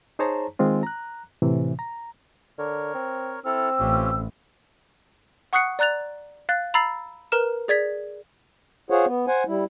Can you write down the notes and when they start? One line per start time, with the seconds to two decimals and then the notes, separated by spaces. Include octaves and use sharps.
0.19 D#4 G#4 C5 C#5 A5 A#5
0.59 D#3 G#3 C4 F4
0.83 A#5 F#6
1.42 A2 C3 E3
1.79 A#5
2.59 D3 A#4 C#5
2.95 C4
3.45 C4 E4 A4 E6 F6
3.79 A1 C#4 F4 G4
5.53 F#5 C#6 D#6 F#6 C7 C#7
5.79 D5 A#5 F#6 A6 F7
6.49 F5 F#6 A6
6.74 A#5 B5 E6 A6 C7
7.32 A#4 B4 A#5 F6 E7
7.68 G#4 D5 G#6 B6
8.90 F4 G#4 C5 C#5 F#5
9.06 B3
9.27 C5 F#5 G#5
9.47 G3 E4